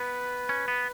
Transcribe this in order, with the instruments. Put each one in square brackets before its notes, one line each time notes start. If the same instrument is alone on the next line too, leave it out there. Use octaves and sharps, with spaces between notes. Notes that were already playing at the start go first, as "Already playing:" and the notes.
Already playing: [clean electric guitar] B3 [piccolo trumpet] B4
[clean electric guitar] C#4
B3